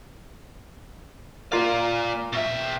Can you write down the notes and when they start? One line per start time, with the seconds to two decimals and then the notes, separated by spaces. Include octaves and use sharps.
1.52 A#3 F4 A#4 D5 F5
2.33 B2 E5